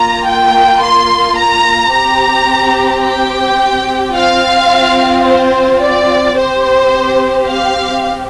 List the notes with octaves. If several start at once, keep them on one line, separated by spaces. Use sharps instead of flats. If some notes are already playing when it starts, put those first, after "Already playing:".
Already playing: A#3 F4 A#5
G5
C6
A#5
C4 G4 A#5
G5
C4 F4 F5
C5
D5
C4 G4 C5
F5